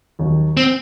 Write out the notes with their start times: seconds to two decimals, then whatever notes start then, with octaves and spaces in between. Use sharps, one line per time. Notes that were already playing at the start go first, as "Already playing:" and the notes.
0.19 D#2 D#3 F#3
0.57 C4